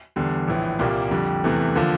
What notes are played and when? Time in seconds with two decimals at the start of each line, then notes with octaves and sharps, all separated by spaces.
0.16 E2 D3 G3
0.48 A#1 A2 E3
0.79 C2 A#2 G3 A#3
1.11 F2 D3 G3
1.44 E2 C3 E3 A3
1.75 D3 F3 A#3